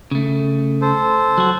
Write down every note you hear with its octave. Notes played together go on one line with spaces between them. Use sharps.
C#3 A3
A4 C5
F#3 F#4